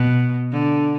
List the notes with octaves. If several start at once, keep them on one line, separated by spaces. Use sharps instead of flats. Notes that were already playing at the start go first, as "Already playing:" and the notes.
Already playing: B2
D3